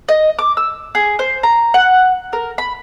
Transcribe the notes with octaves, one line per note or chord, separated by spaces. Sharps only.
D#5
D6
E6
G#4
C5
A#5
F#5
A#4
B5